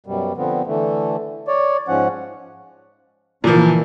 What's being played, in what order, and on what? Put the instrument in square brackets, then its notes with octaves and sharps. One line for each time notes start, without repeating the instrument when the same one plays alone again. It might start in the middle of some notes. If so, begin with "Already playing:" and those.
[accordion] F#2 B2 G3
D3 F3 B3 C4
D3 E3 A3
C#5 D5
G#2 F3 C#4 F#5
[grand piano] A#2 F3 [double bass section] C#3 E3 A#3